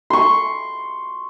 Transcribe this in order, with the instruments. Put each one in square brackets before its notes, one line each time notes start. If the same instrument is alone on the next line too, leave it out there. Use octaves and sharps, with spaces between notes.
[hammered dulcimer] C6 C#6